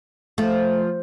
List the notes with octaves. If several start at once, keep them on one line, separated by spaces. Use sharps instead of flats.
F3 A3